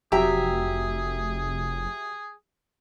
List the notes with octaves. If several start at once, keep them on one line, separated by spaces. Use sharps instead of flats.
F1 F#3 G4 G#4 E5 G5 A#5